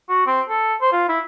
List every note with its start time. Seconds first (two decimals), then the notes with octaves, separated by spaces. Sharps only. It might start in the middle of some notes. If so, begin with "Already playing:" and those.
0.09 F#4
0.27 C4
0.49 A4
0.81 C5
0.92 F4
1.09 E4